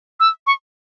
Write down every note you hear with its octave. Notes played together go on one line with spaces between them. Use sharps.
E6
C#6